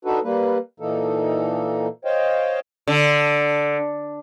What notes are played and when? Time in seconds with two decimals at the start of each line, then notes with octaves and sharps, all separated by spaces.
0.05 D4 D#4 F#4 A4 B4
0.24 G3 A#3 B4
0.80 A#2 E3 A#3 D#4 A4
2.05 C5 C#5 D#5 F5 G5
2.88 D3